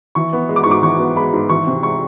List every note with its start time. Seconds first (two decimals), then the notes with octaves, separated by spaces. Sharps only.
0.15 E3 C#6
0.33 B3
0.49 G#3
0.56 D6
0.64 C#6
0.66 G#2
0.71 D6
0.83 E3 C#6
0.99 B3
1.16 G#3 B5
1.33 G#2
1.49 E3 C#6
1.67 C3
1.83 G#3 C#6